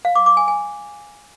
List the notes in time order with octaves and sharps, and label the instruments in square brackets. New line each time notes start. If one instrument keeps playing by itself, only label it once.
[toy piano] F5
D6
D6
G#5
G#5